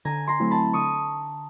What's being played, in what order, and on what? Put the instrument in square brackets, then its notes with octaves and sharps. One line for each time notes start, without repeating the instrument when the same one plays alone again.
[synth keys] D3 [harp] G#5 A#5
[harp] A#5 C6
[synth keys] F#3 A3 C4 E4
[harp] A5 B5
[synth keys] D3 [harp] C#6 D#6